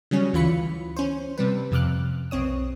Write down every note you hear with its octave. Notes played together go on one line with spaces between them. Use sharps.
C#3 F#3 G3 C#4
D2 E3 F4 B5 C#7
C#4 C5
C3 G3 B4
F2 C3 D6 F6 F#6
B1 C4 C#5 D#6